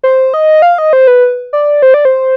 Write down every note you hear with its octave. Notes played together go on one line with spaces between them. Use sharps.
C5
D#5
F5
D#5
C5
B4
D5
C5
D5
C5